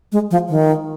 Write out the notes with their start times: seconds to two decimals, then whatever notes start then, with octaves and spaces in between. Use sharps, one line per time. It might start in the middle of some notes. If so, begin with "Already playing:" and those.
0.12 G#3
0.31 F3
0.49 D#3